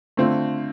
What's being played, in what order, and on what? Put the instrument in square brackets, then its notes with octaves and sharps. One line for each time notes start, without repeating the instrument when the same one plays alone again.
[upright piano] D3 A3 C4 F4